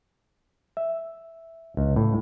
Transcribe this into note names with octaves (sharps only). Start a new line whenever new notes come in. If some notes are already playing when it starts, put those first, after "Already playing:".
E5
C#2
A2